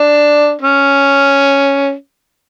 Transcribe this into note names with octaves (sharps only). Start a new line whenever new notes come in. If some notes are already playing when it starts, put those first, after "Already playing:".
Already playing: D4
C#4